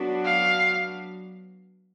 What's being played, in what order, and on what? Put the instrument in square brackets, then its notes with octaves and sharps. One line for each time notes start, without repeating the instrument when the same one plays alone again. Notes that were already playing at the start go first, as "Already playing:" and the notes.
Already playing: [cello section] F#3 B3 D4 F#4
[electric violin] F5